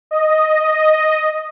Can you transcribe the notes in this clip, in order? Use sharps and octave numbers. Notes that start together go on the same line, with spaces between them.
D#5